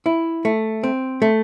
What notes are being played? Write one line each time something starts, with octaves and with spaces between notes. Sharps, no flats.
E4
A3
C4
A3